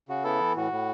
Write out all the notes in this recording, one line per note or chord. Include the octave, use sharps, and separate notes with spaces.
C#3 F#4
B3 E4 A4
E3
A2 F#4
A2